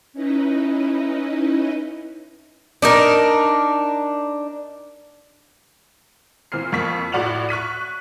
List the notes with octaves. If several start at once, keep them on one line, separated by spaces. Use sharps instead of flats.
C#4 D#4 E4 B4 D#5
D4 D#4 A#4
A#2 E3 C4 F6 C7
F2 A#3 C#6 B6
A2 F#4 D5 F#5 F7 F#7
C#6 F#6 B6 D#7